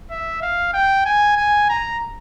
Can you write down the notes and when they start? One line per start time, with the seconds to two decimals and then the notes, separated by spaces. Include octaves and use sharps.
0.11 E5
0.42 F5
0.74 G5
1.06 G#5
1.37 G#5
1.70 A#5